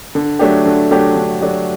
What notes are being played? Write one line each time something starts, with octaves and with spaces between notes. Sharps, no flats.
D3
F#3 A3 D4 G4
D3
F#3 A3 D4 G4
D3
F#3 A3 D4 G4